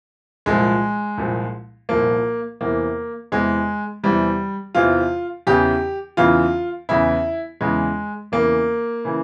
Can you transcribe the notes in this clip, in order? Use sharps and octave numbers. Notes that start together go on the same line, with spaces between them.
C2 A#2 F3 G#3
C2 A#2 F3
C2 A#2 F3 A#3
E2 C3 E3 A#3
E2 C3 E3 G#3
E2 C3 E3 G3
E2 C3 E3 F4
E2 C#3 E3 G4
E2 C#3 E3 F4
E2 C#3 E3 E4
E2 C#3 E3 G#3
E2 C#3 E3 A#3
C#3 E3